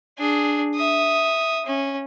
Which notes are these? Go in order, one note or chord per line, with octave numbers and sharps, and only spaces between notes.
D4 G#4
E5 D#6
C#4